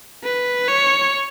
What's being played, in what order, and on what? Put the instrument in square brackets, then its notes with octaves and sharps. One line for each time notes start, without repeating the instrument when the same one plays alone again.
[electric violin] B4
C#5